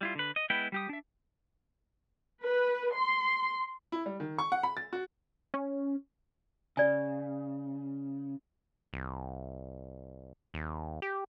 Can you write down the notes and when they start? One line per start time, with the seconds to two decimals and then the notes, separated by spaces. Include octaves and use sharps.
0.01 G3 E4 F4
0.15 D3 B4
0.36 D#5
0.50 G#3 B3 E4 B4 G5
0.72 G3 G4 D#6
0.89 D4 E5
2.42 B4
2.94 C6
3.92 E4
4.06 G3
4.20 D#3
4.39 C#6
4.52 F#5
4.63 B5
4.77 A6
4.93 F#4
5.54 C#4
6.77 C#3 D5 G#5
8.93 C2
10.54 D#2
11.02 G4